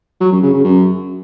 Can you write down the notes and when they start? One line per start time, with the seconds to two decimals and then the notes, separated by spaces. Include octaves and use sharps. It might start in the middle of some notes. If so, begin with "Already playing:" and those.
0.21 F#3
0.32 F#2
0.43 C#3
0.54 C#3
0.65 F#2